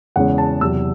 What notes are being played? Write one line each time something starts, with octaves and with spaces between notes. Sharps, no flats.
E2 C#3 G#3 C#4 F#5
A5
E2 C3 F#3 E6